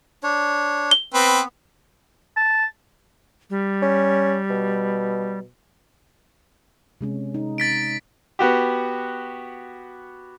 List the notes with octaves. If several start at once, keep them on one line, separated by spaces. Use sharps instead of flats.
D4 C#5
G7
B3 C4 B4
A5
G3
C#4
B2
C3 G#3 C#4
D#4
A6 B6 D7
B3 F#4 G4